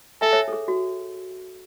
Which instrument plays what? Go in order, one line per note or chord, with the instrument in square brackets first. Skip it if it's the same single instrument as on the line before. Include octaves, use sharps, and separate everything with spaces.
[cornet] A4 [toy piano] E5 G#5
[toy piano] C#5 E5
A4
G#4
F#4